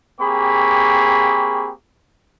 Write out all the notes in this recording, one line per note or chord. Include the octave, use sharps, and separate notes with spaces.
A#3 C4 G4 G#4 B5 C#6